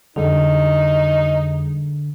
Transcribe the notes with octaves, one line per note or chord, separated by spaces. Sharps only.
F2 D3 G3 D#4 G#4